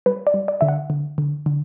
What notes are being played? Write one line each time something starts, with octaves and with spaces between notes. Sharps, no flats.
G3 B4
D5
G3
D5
D3 E5
F#5
D3
D3
D3